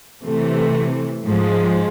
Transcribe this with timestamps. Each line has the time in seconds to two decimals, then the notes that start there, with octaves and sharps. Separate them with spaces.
0.23 C3 E3 A3
1.25 G#2 F3 G#3